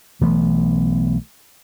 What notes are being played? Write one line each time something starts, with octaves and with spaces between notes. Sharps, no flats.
B1 E3 A3 B3